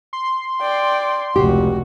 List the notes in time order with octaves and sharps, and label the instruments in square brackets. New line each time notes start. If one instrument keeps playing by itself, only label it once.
[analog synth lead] C6
[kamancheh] D5 G5
[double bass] F1 C#2 [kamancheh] F#4 [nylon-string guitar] G4